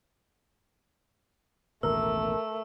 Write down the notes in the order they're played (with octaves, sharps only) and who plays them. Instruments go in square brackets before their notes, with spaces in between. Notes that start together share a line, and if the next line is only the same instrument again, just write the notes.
[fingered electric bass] A1 D#2 B2 [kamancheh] A3 [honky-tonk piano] A#4 [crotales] E6